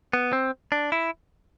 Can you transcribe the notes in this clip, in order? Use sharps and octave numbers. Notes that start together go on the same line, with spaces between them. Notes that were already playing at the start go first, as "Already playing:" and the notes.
B3
C4
D4
E4